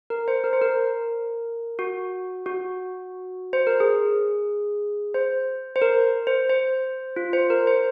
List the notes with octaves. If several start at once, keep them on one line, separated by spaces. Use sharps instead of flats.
A#4
C5
A#4
C5
A#4
F#4
F#4
C5
A#4
G#4
C5
C5
A#4
C5
C5
F4
C5
A#4
C5